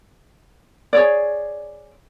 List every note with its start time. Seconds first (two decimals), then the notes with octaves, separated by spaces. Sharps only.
0.93 G#4 C#5 D5